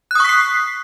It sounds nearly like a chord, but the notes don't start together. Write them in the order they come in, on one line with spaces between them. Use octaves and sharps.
F#6 D#6 C#6 B6 C7